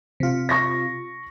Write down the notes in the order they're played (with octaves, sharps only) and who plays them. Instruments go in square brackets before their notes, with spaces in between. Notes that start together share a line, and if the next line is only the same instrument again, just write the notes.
[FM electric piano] C3 F4
[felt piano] C#6 A#6